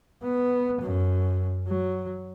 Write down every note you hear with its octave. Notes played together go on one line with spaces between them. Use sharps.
B3
F#2
F#3